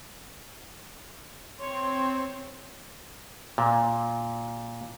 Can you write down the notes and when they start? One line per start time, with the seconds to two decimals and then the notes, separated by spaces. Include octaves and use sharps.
1.59 C4 C#5 C6
3.58 A#2